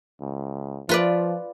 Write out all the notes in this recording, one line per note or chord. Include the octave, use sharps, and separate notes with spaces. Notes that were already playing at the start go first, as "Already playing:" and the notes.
C#2
F3 F4 B4 D5